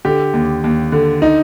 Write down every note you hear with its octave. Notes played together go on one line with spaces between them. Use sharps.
D3 G4
D#2
D#2
D3
D#4